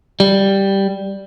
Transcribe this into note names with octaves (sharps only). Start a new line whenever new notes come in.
G3